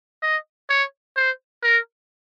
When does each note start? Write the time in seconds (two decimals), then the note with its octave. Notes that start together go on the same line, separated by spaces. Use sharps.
0.23 D#5
0.70 C#5
1.16 C5
1.64 A#4